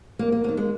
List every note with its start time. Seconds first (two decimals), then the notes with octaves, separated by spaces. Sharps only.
0.19 F2 A#3
0.32 A#3
0.44 D#3 F#3 A#3
0.57 G#3